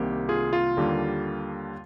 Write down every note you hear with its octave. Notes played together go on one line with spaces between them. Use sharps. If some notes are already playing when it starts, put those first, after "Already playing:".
Already playing: C2 C3 D#3 A#3 G4
F4 G#4
F4
D#2 D3 G3 A#3